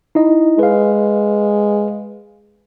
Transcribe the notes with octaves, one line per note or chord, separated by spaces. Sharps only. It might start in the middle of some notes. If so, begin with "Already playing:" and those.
D#4 E4 D#5
G#3 B4 F5